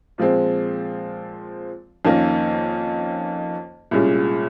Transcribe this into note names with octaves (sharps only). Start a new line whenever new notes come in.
A#2 F3 G#3 C4
F2 D#3 A#3 C#4
C2 A#2 G#3 C#4